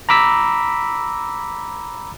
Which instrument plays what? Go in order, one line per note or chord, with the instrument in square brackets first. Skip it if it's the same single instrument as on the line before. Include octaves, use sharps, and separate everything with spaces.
[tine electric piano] A#5 B5 D6 E6 B6